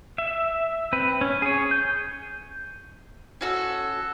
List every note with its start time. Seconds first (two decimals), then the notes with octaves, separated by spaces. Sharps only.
0.18 E5
0.93 C4 B4
1.21 C#4
1.42 G#4 C#5
1.71 G6
3.41 C#4 F#4 A4